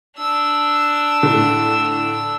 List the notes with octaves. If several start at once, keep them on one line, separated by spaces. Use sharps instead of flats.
D4 E6
A2 D3